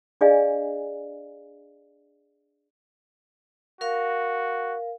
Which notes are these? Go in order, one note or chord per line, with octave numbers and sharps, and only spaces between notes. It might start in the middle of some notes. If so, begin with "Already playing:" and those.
D4 G#4 D5 D#5 F5 G#5
F#4 A#4 F5